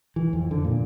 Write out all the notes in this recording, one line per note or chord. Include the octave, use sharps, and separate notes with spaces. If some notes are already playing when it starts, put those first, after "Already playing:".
E3
F2
D3
A#2